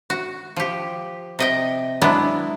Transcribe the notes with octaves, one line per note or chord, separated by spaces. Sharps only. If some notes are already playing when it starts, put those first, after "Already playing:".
F#4
F3 G4
C3 D#5 G5
F#3 G#3 B3 D4 E4